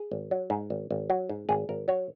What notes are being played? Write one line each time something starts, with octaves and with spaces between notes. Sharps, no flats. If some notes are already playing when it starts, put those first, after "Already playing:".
Already playing: G#4
G#1
F#3
G#2
G#1
G#1
F#3
G#2
G#1 G#4
G#1 A#4
F#3 C#5